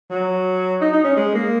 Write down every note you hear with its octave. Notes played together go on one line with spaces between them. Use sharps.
F#3
D#4
D#4
C#4
G#3
A#3